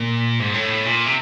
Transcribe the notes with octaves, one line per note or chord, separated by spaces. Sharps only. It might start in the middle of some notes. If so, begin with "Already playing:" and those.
Already playing: A#2
G#2
A2
A#2
C3